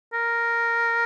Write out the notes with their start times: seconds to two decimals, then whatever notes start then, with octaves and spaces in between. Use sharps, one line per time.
0.13 A#4